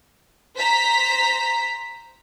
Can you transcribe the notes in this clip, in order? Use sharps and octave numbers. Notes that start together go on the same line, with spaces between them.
C5 A#5 B6